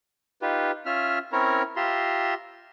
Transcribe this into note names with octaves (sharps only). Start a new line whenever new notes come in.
D#4 F4 G4 B4
C#4 F4 E5 F6
C4 C#4 E4 A#4 C#5 A#5
F4 G4 E5 A#5 C6